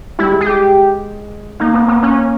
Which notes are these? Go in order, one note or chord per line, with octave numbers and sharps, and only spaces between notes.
G3 E4
G#3
G#4
G4
A#3 D#4
B3
B3
C#4